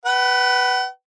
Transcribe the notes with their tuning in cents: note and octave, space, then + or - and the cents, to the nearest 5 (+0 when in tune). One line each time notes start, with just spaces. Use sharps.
B4 +0 F#5 +40